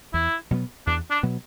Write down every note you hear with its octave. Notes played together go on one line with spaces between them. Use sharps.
E2 E4
B2 F#3 B3
E2 D4
D4
B2 F#3 B3